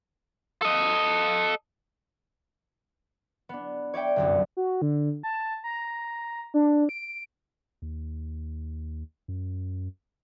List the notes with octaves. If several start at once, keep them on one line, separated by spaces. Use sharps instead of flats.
A4 D#5
B3 D4
C#5 D5 E5 G5
G1 C2 F#2
F#4
D3
A5
A#5
D4
D7
D#2
F#2